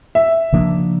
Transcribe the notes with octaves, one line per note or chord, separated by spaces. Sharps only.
E5
C#3 F3 A#3 D4